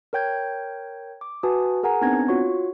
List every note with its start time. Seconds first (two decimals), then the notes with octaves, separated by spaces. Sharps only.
0.13 A#4 C#5 G5 G6 G#6
1.21 D6
1.43 F#4 B4 G#5 A5 D#6
1.83 G#4 A#4 F#5 G#5 A#5
2.02 B3 C4 D4 D#4 G#6 A#6
2.28 F4 F#4 C#5 C#6